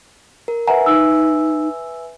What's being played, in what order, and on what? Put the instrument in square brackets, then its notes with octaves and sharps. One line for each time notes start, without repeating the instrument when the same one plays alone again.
[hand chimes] A#4
[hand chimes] B4 E5 G#5 [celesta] F#5 A#5
[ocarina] D#4 [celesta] E6